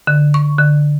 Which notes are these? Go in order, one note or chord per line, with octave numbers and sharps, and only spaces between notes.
D3
C#6
D3